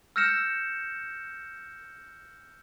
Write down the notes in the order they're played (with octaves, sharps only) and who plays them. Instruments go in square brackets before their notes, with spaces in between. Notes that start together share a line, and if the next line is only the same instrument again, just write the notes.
[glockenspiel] E6 F6 G6 A#6 C#7 E7